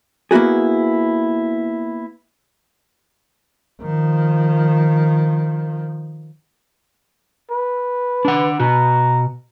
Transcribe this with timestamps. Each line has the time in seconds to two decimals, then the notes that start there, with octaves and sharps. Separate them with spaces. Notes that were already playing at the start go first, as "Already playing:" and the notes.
0.31 A#3 B3 E4 F#4 G#4
3.81 D#3 F3
7.51 B4
8.25 D4 F#5
8.60 B2 F#4 A#5